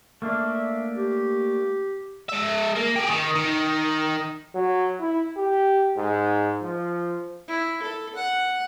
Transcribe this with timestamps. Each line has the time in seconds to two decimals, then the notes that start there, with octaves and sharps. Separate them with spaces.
0.22 A3 A#3 D4 E5
0.96 G4
2.29 G#3 E5
2.76 A#3
2.96 G4 G#4
3.09 D#3
3.35 D#3
4.55 F#3
5.01 E4
5.37 G4
5.97 G#2
6.63 F3
7.48 E4
7.82 A4
8.16 F#5